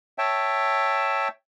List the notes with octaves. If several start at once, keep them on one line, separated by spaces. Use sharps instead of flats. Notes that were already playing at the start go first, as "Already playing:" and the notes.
C#5 E5 G5 A5